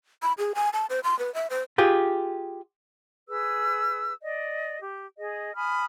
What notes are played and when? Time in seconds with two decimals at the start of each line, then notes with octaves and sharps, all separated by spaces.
0.23 B5
0.38 G#4
0.55 G#5
0.73 A5
0.90 C5
1.04 C6
1.19 B4
1.34 E5
1.50 C5
1.78 F4 G4 G#4
3.29 G#4 B4 E6
4.23 D5 D#5
4.82 G4
5.18 G#4 D#5
5.55 G#5 B5 D#6 F6